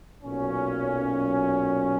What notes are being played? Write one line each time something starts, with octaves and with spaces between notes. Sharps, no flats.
B1 A#2 F#3 C#4